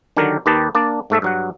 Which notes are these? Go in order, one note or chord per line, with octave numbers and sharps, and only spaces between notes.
D3 D#3 F#3 G4 A#4
D#2 D#3 G4 B4 D#5 A5
A#3 D4 D5
G#2 A3 A4 E5
G2 F#3 F#5